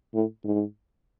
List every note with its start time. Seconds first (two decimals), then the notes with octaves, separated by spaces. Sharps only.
0.14 A2
0.44 G#2